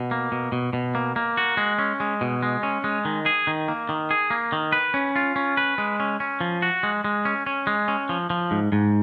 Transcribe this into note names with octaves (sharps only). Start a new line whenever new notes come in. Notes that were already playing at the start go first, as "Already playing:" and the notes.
Already playing: B2
A#3
B2
B2
B2
A#3
A#3
F#4
G#3
C#4
G#3
B2
G#3
C#4
G#3
D#3
G#4
D#3
A#3
D#3
G#4
A#3
D#3
B4
C#4
F4
C#4
B4
G#3
C#4
C#4
F3
F#4
G#3
G#3
C#4
C#4
G#3
C#4
F3
F3
G#2
G#2